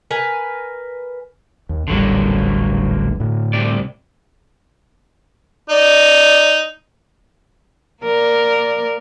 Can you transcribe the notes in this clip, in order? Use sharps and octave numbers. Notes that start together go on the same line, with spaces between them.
A#4 B4 G#5
D#2
D#1 A1 D3 F#3 G3 A#3
D2 A2
C2 C3 D5
D#4 D5
A#3 A#4 D5